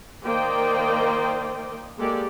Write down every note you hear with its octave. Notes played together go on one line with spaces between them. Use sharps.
D#3 A#3 C5 D5 D#5 G5
G#3 A#3 G4 A4 A#4 D5